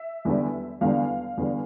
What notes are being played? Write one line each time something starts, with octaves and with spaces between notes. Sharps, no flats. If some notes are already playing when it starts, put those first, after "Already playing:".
Already playing: E5
E2 D3 G3
E2 D3 G3 F5
E2 D3 G3